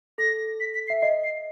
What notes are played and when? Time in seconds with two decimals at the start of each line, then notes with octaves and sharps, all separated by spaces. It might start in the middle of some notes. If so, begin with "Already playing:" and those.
0.18 A4 A#6
0.60 B6
0.74 B6
0.88 E5 C7
1.02 D#5 C7
1.23 C7